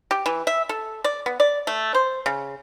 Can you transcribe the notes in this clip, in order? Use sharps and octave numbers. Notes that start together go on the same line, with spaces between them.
G4
E3
E5
A4
D5
B3
D5
A3
C5
C#3